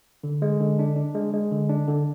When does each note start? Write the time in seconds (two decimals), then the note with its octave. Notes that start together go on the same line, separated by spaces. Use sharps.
0.24 D3
0.42 G#3
0.60 D3
0.79 D4
0.96 D4
1.14 G#3
1.33 G#3
1.51 D3
1.69 D4
1.88 D3